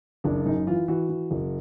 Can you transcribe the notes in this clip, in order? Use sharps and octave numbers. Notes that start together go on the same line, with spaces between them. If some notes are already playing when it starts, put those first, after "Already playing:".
F#1 D4
F#2 D#4
E3 F4
E3 F#4
E3
F#1